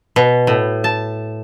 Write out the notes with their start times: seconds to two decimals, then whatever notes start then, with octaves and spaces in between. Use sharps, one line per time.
0.16 B2
0.47 A2
0.84 A5